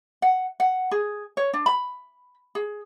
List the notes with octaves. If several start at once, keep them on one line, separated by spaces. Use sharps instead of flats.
F#5
F#5
G#4
C#5
D4
B5
G#4